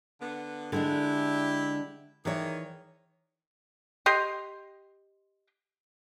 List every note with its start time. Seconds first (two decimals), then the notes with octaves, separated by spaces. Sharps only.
0.20 D3 B3
0.72 D3 G#3 D4 E4 G4 E5
2.25 D#3 E3 G#4 C#5
4.06 G4 D#5 C6